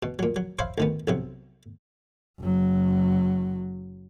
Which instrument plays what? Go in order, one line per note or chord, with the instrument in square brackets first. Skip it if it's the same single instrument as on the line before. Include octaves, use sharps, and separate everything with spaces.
[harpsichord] B2
A#2 F#3
F#3
C5 C#5 E5 F5 B5
D2 D#3 B3
B1 C3 F#3
[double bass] F#1 F#3